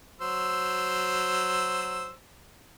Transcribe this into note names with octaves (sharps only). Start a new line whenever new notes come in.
F#3 C5 E6